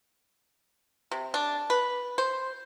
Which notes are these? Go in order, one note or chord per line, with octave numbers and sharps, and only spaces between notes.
C3
D4
B4
C5